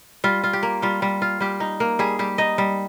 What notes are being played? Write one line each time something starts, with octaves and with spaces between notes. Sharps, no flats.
G3 F4
F4
G4
A#3
G3 F4
G3
F4
G3 G4
D#4
A#3
G3 G#4
G3 G4
D#4 D#5
G3